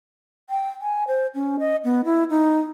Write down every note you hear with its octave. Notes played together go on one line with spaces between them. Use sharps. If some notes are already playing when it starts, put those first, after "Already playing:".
G5
G#5
C5
C#4
D#5
B3
E4
D#4